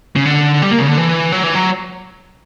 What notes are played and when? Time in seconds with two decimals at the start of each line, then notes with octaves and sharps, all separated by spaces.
0.16 C#3
0.25 D3
0.62 G3
0.71 A#3
0.79 C#3
0.88 D3
0.97 E3
1.32 F#3
1.44 E3
1.55 F#3